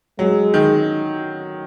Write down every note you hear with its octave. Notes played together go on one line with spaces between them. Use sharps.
F#3 G#3
D#3